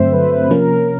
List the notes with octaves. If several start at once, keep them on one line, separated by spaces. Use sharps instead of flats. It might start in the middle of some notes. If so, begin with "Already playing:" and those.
Already playing: G2 D3 F#3 A3 C4 C5 E5
B4
C3 F3 A#3 C#4 A#4